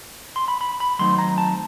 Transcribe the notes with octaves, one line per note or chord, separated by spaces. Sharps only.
C6
B5
B5
B5
D#3 F#3 A3 C4 D#4 C6
A#5
A5